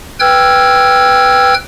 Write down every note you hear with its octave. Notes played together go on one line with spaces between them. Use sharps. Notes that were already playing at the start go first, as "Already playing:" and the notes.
B4 G5 E6 F6 G#6